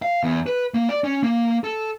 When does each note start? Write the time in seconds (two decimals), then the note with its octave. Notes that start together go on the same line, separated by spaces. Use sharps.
0.02 F5
0.23 E2
0.46 B4
0.74 A#3
0.89 D5
1.04 C#4
1.23 A#3
1.64 A4